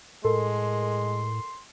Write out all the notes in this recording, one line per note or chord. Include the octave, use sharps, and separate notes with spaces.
A2 G#3 A4 A#4 C6